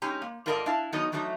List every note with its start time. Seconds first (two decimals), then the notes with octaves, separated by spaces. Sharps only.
0.02 G#3 C#4 D#4 G4 A#5
0.22 A#3
0.46 G#2 F4 A4 A#4 D5 D#5
0.66 D4 E4 F5 A5
0.92 D#3 F#3 B3 D#4 A4 D#5
1.12 D#3 E3 F#3 A3 D#4